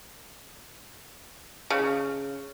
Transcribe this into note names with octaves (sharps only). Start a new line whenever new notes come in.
C#3